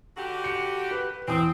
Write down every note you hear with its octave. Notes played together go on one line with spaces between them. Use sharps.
D3 F#4 G4
C#7
B4
E2 C4 D#6